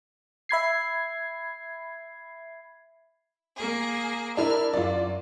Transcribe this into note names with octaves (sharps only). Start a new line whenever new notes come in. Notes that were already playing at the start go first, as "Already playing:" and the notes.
E5 B5 G#6 C7
A#3 G#4
D4 E4 A#4 F6
F#2 F4 D5